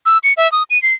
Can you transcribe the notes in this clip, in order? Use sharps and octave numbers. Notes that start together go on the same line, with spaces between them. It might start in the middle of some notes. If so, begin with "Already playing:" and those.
E6
C#7
E5
D#6
D#7
C7